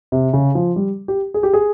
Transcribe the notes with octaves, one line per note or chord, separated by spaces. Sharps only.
C3
C#3
F3
G3
G4
G#4
G4
G#4